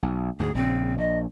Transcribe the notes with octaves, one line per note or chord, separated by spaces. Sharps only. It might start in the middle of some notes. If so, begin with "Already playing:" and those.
B1
D2 G#2 G#4
A#1 C#3 C4
A#1 D#5